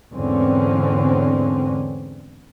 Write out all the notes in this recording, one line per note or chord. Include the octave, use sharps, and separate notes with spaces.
E2 G#2 D3 C4 C#4